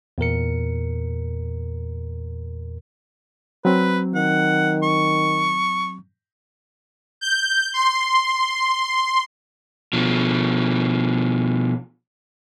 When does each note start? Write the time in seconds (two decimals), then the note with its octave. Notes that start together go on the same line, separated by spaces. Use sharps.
0.18 E2 A#2 A#4 C#7
3.65 F#3 C4 B4
4.15 D#3 F#5
4.83 C#6
7.21 G6
7.74 C6
9.93 B2 F3